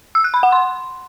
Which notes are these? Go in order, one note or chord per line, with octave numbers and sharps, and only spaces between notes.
E6
F#6
B5
F#5
C6